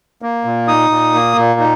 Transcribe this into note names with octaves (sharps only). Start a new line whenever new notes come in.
A#3
A#2
D#4 D#6
A#2
A#3
A#2
D#4